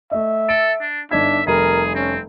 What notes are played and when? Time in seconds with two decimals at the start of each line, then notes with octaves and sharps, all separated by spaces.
0.12 A3 D#5 E5
0.49 A4 D7
0.81 D4
1.11 G1 D4 D#4 E5 G#6
1.47 F1 G3 G#4 A#4
1.95 C4 C#4